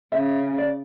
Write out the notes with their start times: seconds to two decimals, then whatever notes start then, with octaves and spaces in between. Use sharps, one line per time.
0.12 C#3 E5
0.58 D5